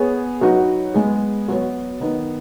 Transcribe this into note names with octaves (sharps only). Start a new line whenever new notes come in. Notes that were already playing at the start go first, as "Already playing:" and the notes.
Already playing: B3 G#4 C#5
F#3 D#4 F#4 B4
G#3 B3 G#4 B4
F#3 B3 F#4 C#5
D#3 B3 D#4